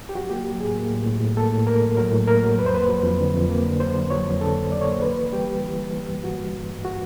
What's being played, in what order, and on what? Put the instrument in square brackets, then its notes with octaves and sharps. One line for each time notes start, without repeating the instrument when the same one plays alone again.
[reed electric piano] G4
F#3 F#4
A#3 G4
F#3
A2 G#4
A#3
A2
A2
A2
A#3 A4
A2
A#3 A#4
F#3
F#3 A#4
A2
A#3 A#4
F#3
F2 B4
C5
A#3 B4
F#3
F2
D3
F2
A#3
D3
F#3 C5
D3
F#3 C#5
F2
D3 A4
F#3
D3 D5
C#5
A#3 C5
E3 B4
E3
G3 G4
G3
E3
G3
E3
G2
G2 F#4
G3
G2
G2
F#4